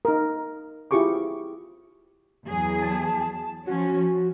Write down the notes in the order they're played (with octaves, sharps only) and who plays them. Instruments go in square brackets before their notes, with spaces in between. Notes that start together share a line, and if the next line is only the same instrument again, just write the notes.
[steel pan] D#4 A#4
E4 F4 G4 G#4 C#6 D6
[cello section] E2 F#3 G#4
[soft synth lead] A5
[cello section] F3 C#4 [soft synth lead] F#4
[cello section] F3